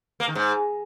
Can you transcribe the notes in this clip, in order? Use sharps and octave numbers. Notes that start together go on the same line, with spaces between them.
A#3
D#3
G#2